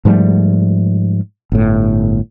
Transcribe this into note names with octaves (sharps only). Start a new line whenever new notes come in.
G#2 F3 G3 A3
G1 A2